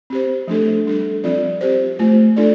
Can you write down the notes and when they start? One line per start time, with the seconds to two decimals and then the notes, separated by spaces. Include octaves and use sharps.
0.10 C4 G4 C5
0.48 F3 A3 D4 A4
0.86 G3 D4 A4
1.24 F3 C4 F4 D5
1.61 C4 G4 C5
1.99 A3 F4 C5
2.36 A3 D4 F4 A4 D5